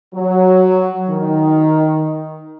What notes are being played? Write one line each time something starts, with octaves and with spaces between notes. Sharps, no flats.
F#3
D#3